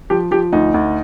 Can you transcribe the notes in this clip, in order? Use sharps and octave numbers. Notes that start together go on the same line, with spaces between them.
F3 G4
F3 G4
D2 D#4
D2